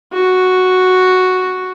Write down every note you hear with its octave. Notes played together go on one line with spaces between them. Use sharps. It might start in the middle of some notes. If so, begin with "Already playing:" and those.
F#4